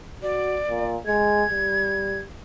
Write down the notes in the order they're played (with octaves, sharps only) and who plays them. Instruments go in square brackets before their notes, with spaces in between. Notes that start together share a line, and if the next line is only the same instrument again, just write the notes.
[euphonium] F#4 [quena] D5
[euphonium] A#2
[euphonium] G#3 [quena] G#6
[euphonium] G3